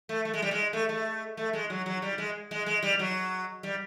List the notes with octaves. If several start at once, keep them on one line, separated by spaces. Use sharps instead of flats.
A3
A3
G#3
G3
G#3
A3
A3
A3
G#3
F#3
F#3
G3
G#3
G#3
G#3
G3
F#3
G3